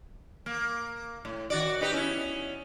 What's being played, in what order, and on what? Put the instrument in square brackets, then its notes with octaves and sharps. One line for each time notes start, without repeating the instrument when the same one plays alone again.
[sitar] A#3
A2
D#3 F#4 D5
D#4 G4 B4
B3 C#4 E4